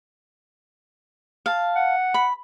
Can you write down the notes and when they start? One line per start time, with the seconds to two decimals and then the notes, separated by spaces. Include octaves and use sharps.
1.46 F5 A5
1.76 F#5
2.14 B5